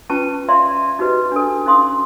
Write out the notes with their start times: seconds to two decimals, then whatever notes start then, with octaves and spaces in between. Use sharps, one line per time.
0.10 C#4 F4 B4 G5 A5 C#6
0.49 D5 E5 F5 A#5 C6
0.99 D#4 F#4 G4 B4 D#5
1.32 D4 A4
1.66 C#4 D#4 F5 C6 D#6